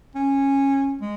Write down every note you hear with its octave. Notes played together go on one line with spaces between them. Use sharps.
C#4
G#3